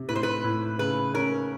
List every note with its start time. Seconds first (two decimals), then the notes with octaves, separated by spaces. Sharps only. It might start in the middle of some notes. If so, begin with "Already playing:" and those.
Already playing: C3
0.08 A2 B4
0.15 C5
0.23 B4
0.44 A2
0.79 C#3 B4
1.14 C#4 A#4